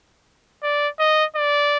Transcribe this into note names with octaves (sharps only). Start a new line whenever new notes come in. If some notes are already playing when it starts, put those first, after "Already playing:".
D5
D#5
D5